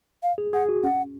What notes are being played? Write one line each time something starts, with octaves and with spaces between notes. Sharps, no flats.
F5
G#4
G#4 F#5
F#4
C#4 F#5